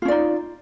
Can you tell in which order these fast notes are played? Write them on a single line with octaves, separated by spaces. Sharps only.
F4 C#4 D5 D#4